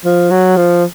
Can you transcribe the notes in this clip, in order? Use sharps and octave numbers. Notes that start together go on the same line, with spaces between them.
F3
F#3
F3